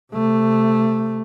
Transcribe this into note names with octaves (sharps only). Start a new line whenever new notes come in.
C3 A3